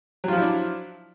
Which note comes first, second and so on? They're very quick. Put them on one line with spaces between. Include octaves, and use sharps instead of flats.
F#3 F4 F3 E4 D4